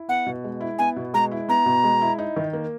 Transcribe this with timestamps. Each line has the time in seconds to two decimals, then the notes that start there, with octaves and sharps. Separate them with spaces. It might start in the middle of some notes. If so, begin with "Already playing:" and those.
Already playing: E4
0.08 B3 F#5
0.26 B2
0.44 G#3
0.61 E4
0.79 B3 G#5
0.96 B2
1.14 G#3 A#5
1.31 E4
1.48 B3 A#5
1.66 B2
1.84 G#3
2.01 E4
2.19 D#4
2.36 D#3
2.53 A#3